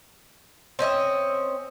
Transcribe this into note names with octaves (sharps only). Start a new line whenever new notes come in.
C4 C#4 D#5 E5